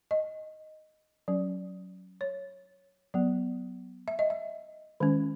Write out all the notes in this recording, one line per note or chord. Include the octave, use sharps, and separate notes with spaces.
D#5
F#3 C#4
C#5
F#3 B3
E5
D#5
E5
D#3 G#3 C#4